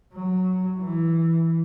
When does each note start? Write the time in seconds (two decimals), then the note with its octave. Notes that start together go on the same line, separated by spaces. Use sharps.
0.14 F#3
0.79 E3